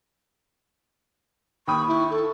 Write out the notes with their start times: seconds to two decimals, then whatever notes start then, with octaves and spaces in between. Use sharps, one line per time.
1.68 D#2 G5 B5 C#6 D#6
1.87 E4
2.11 A4